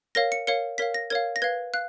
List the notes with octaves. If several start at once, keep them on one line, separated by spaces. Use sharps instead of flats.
A#4 C#5 F5 A#6
C#7
A#4 C#5 F5 C#7
A#4 C#5 F5 B6
A#6
A#4 C#5 F5 G#6
A#6
B4 F5 G#6
F5 F#6